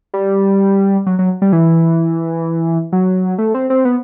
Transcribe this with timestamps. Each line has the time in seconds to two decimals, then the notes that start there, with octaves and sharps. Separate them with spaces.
0.14 G3
1.06 F#3
1.19 F#3
1.42 G3
1.53 E3
2.92 F#3
3.38 A3
3.54 C4
3.70 C4
3.85 B3